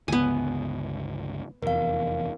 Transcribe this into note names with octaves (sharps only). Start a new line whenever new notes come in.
G1 C#2 B3 G#5
F1 E2 A#4 F5